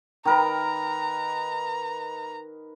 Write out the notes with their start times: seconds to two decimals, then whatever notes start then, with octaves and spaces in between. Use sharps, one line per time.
0.25 D#3 A#4 B4 A#5